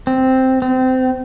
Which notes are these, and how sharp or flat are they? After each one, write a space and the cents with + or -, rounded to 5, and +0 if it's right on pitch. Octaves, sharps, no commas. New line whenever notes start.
C4 -5
C4 -25